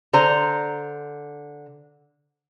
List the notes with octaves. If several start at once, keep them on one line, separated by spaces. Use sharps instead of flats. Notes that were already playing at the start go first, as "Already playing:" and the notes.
D3 C5 A#5